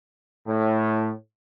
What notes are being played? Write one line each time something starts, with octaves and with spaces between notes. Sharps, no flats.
A2